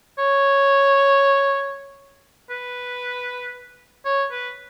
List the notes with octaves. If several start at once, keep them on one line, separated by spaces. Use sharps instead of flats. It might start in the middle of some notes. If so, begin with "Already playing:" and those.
C#5
B4
C#5
B4